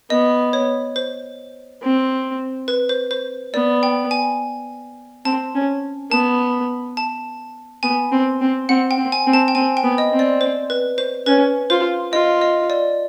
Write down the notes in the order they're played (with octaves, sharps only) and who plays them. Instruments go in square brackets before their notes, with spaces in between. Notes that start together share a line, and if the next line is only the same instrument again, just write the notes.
[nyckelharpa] B3 [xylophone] D#5
[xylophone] C#5
C5
[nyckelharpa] C4
[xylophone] B4
C5
C5
[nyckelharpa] B3 [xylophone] D5
[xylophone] G5
G#5
[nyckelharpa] C4 [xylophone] A5
[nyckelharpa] C#4
[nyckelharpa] B3 [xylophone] A5
[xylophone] A5
[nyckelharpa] B3 [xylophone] G#5
[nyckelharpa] C4
C4
[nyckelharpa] C4 [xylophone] F#5
[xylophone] G5
[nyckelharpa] C4
[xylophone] G#5
[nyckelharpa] C4
[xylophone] A5
G5
[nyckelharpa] C4 [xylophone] G#5
[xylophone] G5
[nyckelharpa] B3
[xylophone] D#5
[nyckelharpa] C4
[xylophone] D5
C5
B4
C5
[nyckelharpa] C#4 [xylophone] B4
[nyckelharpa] F4 [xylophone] C5
[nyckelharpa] F4 [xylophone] D#5
[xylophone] D#5
D5